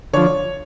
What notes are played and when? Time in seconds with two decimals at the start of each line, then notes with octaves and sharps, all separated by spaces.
0.13 D3 F3 C#5